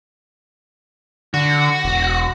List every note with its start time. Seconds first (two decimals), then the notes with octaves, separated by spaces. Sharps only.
1.34 D3 F#4
1.84 E1